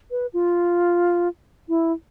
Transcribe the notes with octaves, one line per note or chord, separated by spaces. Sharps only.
B4
F4
E4